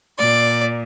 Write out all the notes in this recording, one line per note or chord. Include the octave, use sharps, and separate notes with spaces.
A#2 D5